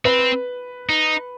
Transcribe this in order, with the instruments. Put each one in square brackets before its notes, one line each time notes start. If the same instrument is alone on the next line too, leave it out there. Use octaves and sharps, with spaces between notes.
[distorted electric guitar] C4 [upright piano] B4
[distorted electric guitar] D#4